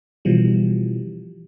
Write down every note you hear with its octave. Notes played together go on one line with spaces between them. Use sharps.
B2 E3 F3 G3